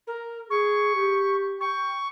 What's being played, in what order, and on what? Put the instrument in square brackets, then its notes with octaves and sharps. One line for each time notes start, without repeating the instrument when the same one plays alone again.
[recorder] A#4
[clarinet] G#4 [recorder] C#6
[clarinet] G4
[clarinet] G5 [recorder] C#6